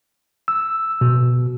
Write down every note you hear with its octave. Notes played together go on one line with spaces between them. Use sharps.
E6
B2